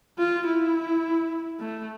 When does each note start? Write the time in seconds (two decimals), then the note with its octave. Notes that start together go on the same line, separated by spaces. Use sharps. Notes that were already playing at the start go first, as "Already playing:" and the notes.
0.18 F4
0.46 E4
1.60 A3